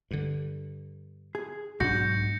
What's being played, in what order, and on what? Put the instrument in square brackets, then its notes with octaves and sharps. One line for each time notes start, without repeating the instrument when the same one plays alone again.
[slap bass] G2 D3
[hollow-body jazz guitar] G#4
[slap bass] B1 D4 [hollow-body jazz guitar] G#2 F#4 [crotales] G6 A#6 C#7